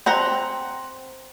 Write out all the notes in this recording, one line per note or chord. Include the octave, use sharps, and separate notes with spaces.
C4 F#5 A#5